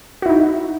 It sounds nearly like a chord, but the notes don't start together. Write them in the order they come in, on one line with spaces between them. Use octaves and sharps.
F#4 E4 D#4